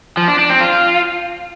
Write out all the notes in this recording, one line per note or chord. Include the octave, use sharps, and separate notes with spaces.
F3
D4
D4
C4
F4